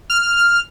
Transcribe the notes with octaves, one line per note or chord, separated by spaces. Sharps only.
F6